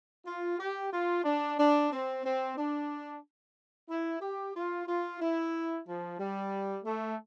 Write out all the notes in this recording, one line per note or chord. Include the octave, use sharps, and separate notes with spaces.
F4
G4
F4
D4
D4
C4
C4
D4
E4
G4
F4
F4
E4
F3
G3
A3